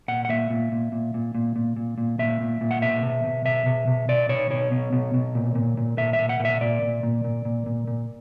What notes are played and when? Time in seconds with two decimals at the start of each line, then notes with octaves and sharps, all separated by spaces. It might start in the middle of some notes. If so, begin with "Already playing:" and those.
0.08 A#2 F#5
0.25 F#5
0.29 A#2 E5
0.50 A#2
0.72 A#2
0.92 A#2
1.14 A#2
1.35 A#2
1.56 A#2
1.77 A#2
1.98 A#2
2.19 A#2 E5
2.41 A#2
2.61 A#2
2.71 F#5
2.82 B2 E5
3.03 B2
3.24 B2
3.45 B2 E5
3.66 B2
3.87 B2
4.08 B2 D5
4.29 B2 C#5
4.50 B2 C#5
4.71 B2
4.93 B2
5.14 B2
5.35 A#2
5.55 A#2
5.77 A#2
5.98 A#2 E5
6.13 E5
6.19 A#2
6.29 F#5
6.40 A#2
6.45 E5
6.61 A#2 D5
6.82 A#2
7.03 A#2
7.24 A#2
7.45 A#2
7.66 A#2
7.88 A#2